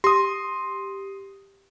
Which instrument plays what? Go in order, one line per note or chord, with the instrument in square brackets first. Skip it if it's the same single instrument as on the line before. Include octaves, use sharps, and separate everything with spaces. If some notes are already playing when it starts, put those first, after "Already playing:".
[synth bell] G4 [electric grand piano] C6 D#6